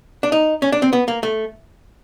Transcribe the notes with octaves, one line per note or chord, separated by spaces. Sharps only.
D4
D#4
C#4
D4
C4
B3
A#3
A3